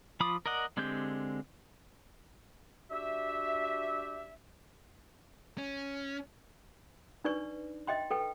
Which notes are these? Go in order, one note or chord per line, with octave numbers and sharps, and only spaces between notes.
F3 F4 B5 D6 D#6
A#4 D5 D#5 F#5
D3 G#3 C4 G4 G6
D4 F#4 G4 E5
C#4
D4 D#4 B4 D5 C#6
D#5 E5 G5 C6
A4 B4 G5